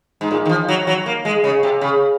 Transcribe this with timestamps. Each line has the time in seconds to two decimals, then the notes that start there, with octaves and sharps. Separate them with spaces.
0.21 G#2
0.31 A#2
0.45 D#3
0.49 F3
0.68 F#3
0.87 F#3
1.06 A#3
1.25 G#3
1.44 C#3
1.63 C3
1.81 C#3